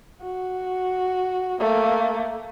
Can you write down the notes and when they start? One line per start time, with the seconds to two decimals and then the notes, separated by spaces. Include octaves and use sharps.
0.21 F#4
1.60 A3 A#3